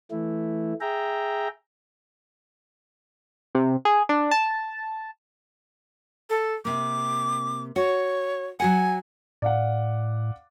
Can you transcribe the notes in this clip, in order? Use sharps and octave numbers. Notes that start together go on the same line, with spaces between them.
E3 A3 E4
G#4 E5 G5 A#5
C3
G#4
D4
A5
A4
C3 A#3 D6
F#4 C#5
F#3 F#4 F#5 G#5
A2 D5 F5 F#5